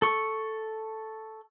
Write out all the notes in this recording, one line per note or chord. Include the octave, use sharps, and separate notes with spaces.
A4 C#6